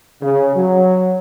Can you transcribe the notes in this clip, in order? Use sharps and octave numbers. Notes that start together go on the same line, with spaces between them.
C#3
F#3